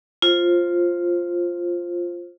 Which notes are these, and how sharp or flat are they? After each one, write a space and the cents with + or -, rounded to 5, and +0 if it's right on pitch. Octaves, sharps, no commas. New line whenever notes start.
F4 +0 C5 +15